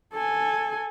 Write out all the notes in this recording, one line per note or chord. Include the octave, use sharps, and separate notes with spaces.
A4 G#5